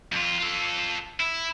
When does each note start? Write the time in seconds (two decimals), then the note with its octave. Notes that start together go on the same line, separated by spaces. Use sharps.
0.12 F2 F4
0.39 F4 A4
1.20 E4